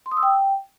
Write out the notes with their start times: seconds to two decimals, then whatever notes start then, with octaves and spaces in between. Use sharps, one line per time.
0.06 C6
0.11 D#6
0.17 E6
0.23 G5